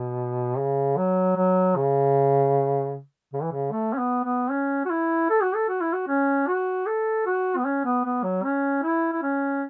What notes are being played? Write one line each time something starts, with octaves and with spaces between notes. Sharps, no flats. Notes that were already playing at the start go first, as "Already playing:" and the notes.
Already playing: B2
C#3
F#3
F#3
C#3
C#3
E3
C#3
A3
C#4
B3
B3
C#4
F#4
E4
A4
F#4
A4
F#4
E4
F#4
C#4
F#4
A4
F#4
B3
C#4
B3
B3
F#3
C#4
E4
E4
C#4